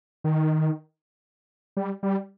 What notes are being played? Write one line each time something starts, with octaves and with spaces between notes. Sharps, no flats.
D#3
G3
G3